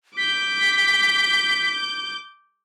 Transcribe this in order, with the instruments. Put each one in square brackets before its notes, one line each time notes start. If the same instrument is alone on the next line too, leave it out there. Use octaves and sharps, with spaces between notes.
[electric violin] D6 G6 [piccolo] B6